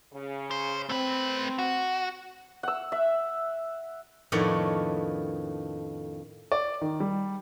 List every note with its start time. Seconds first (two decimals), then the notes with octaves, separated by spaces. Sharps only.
0.13 C#3
0.51 C5
0.89 A3 C4 B4
1.59 F#4
2.63 F#5 E6
2.92 E5
4.32 F2 A2 D#3 B3 D4 C#5
6.52 D5
6.82 D#3
7.00 G3